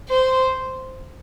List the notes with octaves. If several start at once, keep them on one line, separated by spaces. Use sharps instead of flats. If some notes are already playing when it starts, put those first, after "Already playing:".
C5